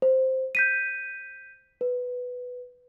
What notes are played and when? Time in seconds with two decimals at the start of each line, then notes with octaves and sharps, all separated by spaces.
0.02 C5
0.55 G6 B6 D#7
1.81 B4